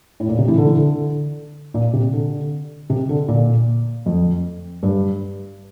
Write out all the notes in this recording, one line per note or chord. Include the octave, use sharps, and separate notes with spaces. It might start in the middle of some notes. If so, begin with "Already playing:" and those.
A2
A#2
C3
E3
D3
E3
D3
A#2
C3
D3
C3
D3
A#2
F2
G2